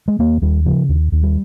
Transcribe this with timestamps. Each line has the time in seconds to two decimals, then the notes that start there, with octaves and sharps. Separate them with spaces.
0.08 G#3
0.19 D#2 A#3
0.42 D#2 G3
0.66 C#3 F3
0.89 D#2
1.12 D#2
1.23 G3